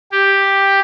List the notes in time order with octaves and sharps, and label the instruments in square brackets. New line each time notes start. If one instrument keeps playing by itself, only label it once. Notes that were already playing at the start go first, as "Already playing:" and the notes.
[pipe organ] G4